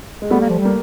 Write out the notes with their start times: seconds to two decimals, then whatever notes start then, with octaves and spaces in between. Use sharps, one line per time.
0.22 G#3
0.30 G3 A3 B3
0.41 A#3
0.50 F3
0.59 G3
0.65 A#3